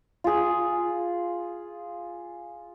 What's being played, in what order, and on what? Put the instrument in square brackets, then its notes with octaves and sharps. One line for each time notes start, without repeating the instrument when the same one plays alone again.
[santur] F4 G#4